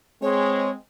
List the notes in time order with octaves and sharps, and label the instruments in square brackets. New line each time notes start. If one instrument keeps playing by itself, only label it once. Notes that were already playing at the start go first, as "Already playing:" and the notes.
[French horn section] G#3 C4 [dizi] C#5